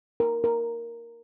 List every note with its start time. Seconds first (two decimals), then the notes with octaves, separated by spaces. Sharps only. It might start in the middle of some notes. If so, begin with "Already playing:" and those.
0.20 A#4
0.44 A#4